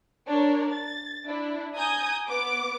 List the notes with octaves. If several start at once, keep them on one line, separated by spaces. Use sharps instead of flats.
D4 A#4 C#5
A6
D4 E4
G#5 A#5 D#6 G6 G#6
B3 D6 D7